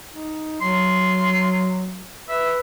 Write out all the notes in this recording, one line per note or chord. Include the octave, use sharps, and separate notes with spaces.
D#4
F#3 C6
B4 E5